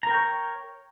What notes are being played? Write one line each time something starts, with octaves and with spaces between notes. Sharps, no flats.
A#4 C#5 G5 A#5